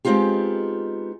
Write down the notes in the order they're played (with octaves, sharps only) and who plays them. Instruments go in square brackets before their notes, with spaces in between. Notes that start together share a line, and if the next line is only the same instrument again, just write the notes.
[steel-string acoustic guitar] G#3 B3 C4 D#4 F4 G4